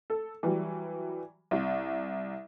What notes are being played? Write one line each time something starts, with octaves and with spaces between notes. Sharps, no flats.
A4
E3 F#3 G3
C2